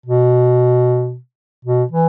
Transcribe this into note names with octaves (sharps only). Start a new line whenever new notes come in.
B2
B2
E3